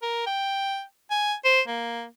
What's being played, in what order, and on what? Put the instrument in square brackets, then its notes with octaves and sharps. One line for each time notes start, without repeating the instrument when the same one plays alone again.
[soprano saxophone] A#4
G5
G#5
C5
A#3